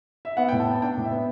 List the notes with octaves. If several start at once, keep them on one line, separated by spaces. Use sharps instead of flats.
E5
B3 F#5
A2 G5
A5
B3
A5
D4 G5
A2
E5
B3